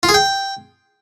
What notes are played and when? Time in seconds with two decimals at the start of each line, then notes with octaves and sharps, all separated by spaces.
0.03 F4
0.09 G#4
0.14 G5